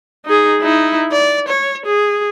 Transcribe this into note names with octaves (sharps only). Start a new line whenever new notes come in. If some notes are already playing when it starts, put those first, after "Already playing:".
D#4 G#4
D#4 E4
D5
C#5
G#4